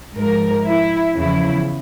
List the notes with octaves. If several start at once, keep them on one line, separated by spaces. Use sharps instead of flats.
G#2 F3 A#4
E4
E2 C#3 F3 E4